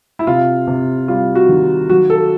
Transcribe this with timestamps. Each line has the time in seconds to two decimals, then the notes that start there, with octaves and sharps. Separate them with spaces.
0.19 E4
0.27 C3 F4
0.67 C3
1.08 G3 F4
1.35 F#4
1.49 D#3
1.89 F#3 F#4
2.10 A4